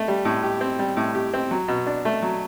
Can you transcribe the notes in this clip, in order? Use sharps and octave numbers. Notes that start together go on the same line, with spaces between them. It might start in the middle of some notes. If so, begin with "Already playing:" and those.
Already playing: A3
G3
A2
G4
C4
G3
A2
G4
C4
F#3
B2
D4
A3
F#3